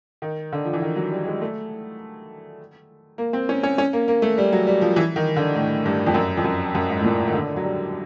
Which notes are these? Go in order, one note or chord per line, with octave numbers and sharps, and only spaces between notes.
D#3
D3
F3
E3
D#3
F#3
G3
G#3
A3
A#3
C4
C#4
C#4
C#4
A#3
A#3
A3
G3
F#3
G3
F3
E3
D#3
D3
A2
G2
F2
F#2
F2
F#2
F#2
G#2
A2
A#2
D#3
D3
F#3
G3